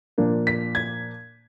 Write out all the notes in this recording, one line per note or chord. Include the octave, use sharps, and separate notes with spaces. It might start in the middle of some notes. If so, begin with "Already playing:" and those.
A#2 F3 A#3 D4
B6
G#6